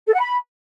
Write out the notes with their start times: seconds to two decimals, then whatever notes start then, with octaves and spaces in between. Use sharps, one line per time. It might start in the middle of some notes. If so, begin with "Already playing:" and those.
0.07 A4
0.14 F#5
0.21 B5